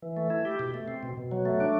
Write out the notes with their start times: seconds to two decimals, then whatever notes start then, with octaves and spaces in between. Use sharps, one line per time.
0.02 E3
0.17 A3
0.30 E4
0.45 G4
0.59 B2
0.74 A3
0.88 C4
1.03 B2
1.17 B2
1.31 F#3
1.45 A3
1.60 D4